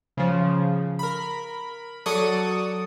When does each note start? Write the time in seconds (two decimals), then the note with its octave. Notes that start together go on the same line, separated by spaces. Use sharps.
0.17 C#3 F3
0.99 A#4 B5
2.06 F#3 A4 D5 C#6 D#6